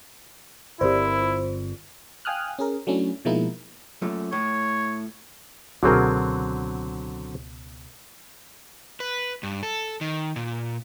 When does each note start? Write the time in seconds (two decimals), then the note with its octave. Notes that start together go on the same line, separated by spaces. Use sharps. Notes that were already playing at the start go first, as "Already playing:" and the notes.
0.81 G1 C#3 C4 E4 G4 A#4 C5 D5
1.21 F4
2.25 F5 G5 G#5 D#6 F6 F#6
2.59 C#4 G#4 A#4
2.87 F#3 A3 C#4 D4 E4
3.25 B2 F3 G#3 A#3 D#4 E4
4.02 F#2 A#2 A3
4.32 A2 C#5
5.83 C#2 B2 D3 F#3 C4 F#4 G#4 A#4
9.00 B4
9.43 G2
9.63 A4
10.01 D#3
10.36 A#2